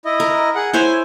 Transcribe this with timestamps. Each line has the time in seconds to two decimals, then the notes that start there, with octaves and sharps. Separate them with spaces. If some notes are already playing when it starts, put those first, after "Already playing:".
0.05 E4 D#5
0.20 A#4
0.55 G#4 F#5
0.73 E4 C5 C#5 G#5